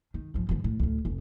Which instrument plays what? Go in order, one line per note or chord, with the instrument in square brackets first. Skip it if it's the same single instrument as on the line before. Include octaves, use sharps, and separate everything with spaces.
[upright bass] D#3
G#2 F3
G#2 D3
A2
D2 A2
F1